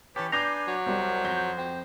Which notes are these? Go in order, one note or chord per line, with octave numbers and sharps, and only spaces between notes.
E3 C#4 G4 B4 C#5 A5
D4 B4 G#5 A#5 D6 G6 C7
F#3
C2 G3 C5
F2 G6
C4